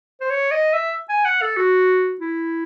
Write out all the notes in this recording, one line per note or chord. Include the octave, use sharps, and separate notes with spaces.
C5
C#5
D#5
E5
G#5
F#5
A4
F#4
E4